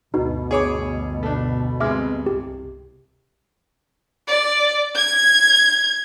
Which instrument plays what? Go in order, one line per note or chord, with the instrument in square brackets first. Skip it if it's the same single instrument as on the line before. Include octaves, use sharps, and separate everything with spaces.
[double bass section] G1 D2 [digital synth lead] B2 [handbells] D#4 F#4
[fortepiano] G#4 C#5 D6
A3 D4
[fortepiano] C3 G#3 [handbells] E5 D6 F6
[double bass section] C2 [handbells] G4
[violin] D5
G#6